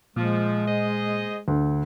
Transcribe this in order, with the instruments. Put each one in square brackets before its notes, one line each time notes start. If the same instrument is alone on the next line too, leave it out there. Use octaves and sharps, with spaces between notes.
[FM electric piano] A#2 [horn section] F3 [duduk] G#3
[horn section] G#4 C5 D#5
[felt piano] D2